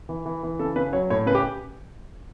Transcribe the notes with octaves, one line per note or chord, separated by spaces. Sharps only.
E3
E3
E3
C#3 A4
C#3 B4
F#3 C#5
A2 C#5
C#3 B4
G4